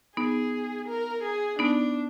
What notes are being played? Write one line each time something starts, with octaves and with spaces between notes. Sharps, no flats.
B3 D#4 G#4
A#4
G#4
B3 D4 D#4